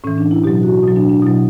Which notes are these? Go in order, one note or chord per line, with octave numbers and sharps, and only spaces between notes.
A2 E3 C#4
D4
E4
B2 F#3 G4
F#4
B2 F#3
D4
D4
B2 F#3 E4